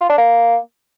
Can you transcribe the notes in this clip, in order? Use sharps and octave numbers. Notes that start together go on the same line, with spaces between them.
F4
D4
A#3